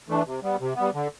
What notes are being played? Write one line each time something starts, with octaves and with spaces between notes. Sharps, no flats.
E3 A3 D4
C3
G3 B3
C3
G3 B3
D3